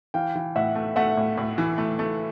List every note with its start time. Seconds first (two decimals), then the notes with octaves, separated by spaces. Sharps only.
0.14 E3 F5 G5
0.35 E3
0.55 A2 E5 F#5
0.75 A3
0.96 A3 E5 F#5
1.17 A2
1.37 A2
1.58 E3
1.78 A3
1.99 A3